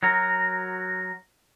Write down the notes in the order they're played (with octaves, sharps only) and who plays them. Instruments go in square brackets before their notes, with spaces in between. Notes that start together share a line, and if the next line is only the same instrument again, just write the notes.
[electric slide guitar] F#3 F#4 A#4